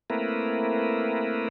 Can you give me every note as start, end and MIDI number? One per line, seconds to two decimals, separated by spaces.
0.10 1.48 57
0.10 1.48 58
0.10 1.48 60
0.10 1.48 64
0.10 1.48 70
0.10 1.48 71